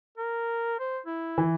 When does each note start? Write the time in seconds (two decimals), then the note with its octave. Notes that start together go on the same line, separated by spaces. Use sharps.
0.18 A#4
0.79 C5
1.06 E4
1.38 E3